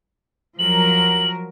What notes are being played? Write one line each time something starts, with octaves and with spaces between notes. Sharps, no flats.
F3 F#3 A#4 F#7